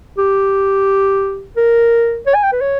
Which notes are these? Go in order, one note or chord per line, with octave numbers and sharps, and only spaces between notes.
G4
A#4
C#5
G#5
G5
B4
C#5